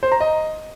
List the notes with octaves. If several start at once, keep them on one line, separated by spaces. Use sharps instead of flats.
C5
A#5
D#5